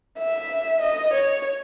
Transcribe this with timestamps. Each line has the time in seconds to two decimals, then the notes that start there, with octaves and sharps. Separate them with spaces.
0.19 E5
0.81 D#5
1.13 C#5